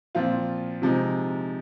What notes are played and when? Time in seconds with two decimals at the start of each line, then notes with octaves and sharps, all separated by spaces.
0.15 A#2 F3 C4 F4
0.82 C3 F3 G#3 D#4